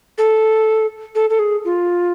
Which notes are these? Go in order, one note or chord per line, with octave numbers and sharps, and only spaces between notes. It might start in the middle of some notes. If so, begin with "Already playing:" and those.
A4
A4
A4
G#4
F4